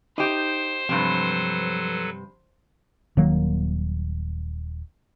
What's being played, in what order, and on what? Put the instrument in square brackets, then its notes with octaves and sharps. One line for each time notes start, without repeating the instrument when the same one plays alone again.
[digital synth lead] D#4 [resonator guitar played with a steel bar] G4 D#5 [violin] C5
[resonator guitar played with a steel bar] G2 C3 [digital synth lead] F3 [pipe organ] F#3 A4 B4
[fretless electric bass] D#1 D#3 F#3 A#3